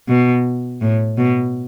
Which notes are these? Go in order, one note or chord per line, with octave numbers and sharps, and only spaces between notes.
B2
A2
B2